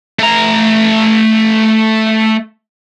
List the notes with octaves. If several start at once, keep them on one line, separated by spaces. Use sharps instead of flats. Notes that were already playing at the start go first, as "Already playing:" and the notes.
A3 A#5